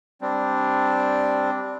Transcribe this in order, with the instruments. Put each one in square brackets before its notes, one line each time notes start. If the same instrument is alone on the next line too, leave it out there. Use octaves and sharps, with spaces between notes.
[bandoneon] G3 C4 D4